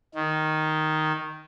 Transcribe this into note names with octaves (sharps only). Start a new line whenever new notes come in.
D#3